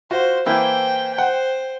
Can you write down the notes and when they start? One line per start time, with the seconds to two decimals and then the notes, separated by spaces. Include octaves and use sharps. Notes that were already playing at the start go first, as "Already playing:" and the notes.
0.11 F4 F#4 C5
0.46 E3 A#3 E4 C5 G5
1.18 C5 F#5 G5